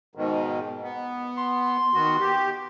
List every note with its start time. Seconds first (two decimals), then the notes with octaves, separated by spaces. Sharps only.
0.15 G#2 B2 D#3
0.82 B3
1.38 C6
1.94 D#3 B3 F#4
2.20 G4